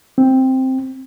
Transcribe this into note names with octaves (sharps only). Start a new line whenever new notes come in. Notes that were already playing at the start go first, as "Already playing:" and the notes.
C4